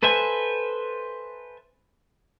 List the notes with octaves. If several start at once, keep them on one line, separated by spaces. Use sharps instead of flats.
A4 B4 C5 E5 G#5